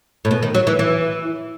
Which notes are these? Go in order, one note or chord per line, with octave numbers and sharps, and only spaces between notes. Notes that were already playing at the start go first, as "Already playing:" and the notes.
A2
B2
D#3
F#3
E3
E3